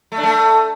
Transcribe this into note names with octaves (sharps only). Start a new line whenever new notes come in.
A3
D4
A3